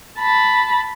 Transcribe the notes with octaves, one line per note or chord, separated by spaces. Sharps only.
A5 B5